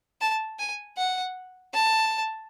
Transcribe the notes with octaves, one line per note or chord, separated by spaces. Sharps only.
A5
G#5
F#5
A5